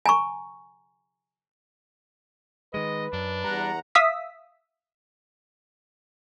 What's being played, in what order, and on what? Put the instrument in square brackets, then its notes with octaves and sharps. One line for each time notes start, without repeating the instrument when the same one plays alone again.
[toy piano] G#5 A#5 C#6
[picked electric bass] D#3 G#3 [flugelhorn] B4 [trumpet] D#5
[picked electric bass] F#2 [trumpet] D4
[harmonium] E2 F#5 A#5 [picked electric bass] G3
[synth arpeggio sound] E5 F5 D#6 E6 B6